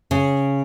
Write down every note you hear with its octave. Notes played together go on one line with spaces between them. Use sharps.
C#3